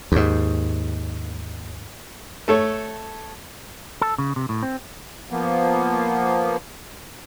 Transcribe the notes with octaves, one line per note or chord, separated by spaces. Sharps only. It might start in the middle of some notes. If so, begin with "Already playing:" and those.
D#2 G#2
A3 A4 C#5
A4
C#3
C3
A2
C4
F3 A#3 B3